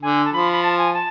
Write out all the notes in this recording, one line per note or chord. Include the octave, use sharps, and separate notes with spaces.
D3 G#5
A5
F3 B5
B5
A5
G#5
A5